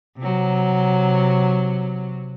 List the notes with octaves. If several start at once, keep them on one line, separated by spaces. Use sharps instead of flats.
C3 F#3